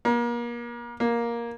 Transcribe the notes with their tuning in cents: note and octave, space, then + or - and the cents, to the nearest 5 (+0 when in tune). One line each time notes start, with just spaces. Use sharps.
A#3 +35
A#3 +10